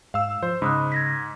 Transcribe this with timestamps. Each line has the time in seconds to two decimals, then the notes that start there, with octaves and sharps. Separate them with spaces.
0.14 G#2 F5 E6
0.43 F3 C5
0.62 G#2 C#3 B5 D#6 F#6
0.92 G#6 A#6 B6